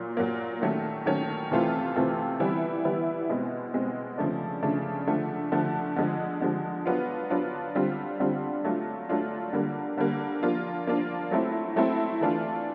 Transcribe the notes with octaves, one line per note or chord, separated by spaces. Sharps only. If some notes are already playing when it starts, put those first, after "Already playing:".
Already playing: A#2 F#3 A#3
A#2 F#3 A#3
D#3 F#3 A3 C#4
D#3 F#3 A3 C#4
C3 E3 A3 C4 F4
C3 E3 A3 C4 F4
E3 G3 B3 E4
E3 G3 B3 E4
B2 G#3 C4
B2 G#3 C4
C#3 F3 A3 D4
C#3 F3 A3 D4
D3 F3 A3
D3 F3 A3
D3 F3 G#3
D3 F3 G#3
F#3 B3 D4 F4
F#3 B3 D4 F4
D3 G3 C4 F4
D3 G3 C4 F4
F#3 A3 D4 F4
F#3 A3 D4 F4
D3 G3 A#3
D3 G3 A#3
F3 A#3 D4 F4
F3 A#3 D4 F4
F#3 A3 C4 E4
F#3 A3 C4 E4
E3 A3 D4 F4